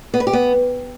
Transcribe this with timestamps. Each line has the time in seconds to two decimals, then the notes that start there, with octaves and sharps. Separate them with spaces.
0.14 B3
0.20 B4
0.27 G4
0.33 B3